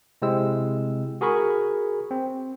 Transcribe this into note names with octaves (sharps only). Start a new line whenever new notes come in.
C3 G#3 C4 E4 E6
F#4 G#4 A#4 B5 C#6
C4